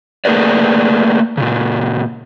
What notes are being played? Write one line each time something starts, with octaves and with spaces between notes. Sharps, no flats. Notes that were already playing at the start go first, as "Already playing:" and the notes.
A3 A#3 G#4 A#4 B4 D5
A#2 C#3